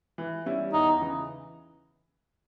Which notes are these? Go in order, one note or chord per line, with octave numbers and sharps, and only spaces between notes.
E3
G3 C#4 E4
E2 D#4
C#3 E3